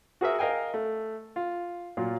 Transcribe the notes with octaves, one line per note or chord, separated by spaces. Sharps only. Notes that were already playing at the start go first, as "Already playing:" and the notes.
F#4 G#4 A#4 E5
A#4 D#5 F5 G5 G#5
A3
F4
A#2 F#3 F4